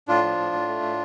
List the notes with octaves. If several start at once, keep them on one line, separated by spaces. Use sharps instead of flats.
A2 D4 F4
F3
A2
A2
A3
A2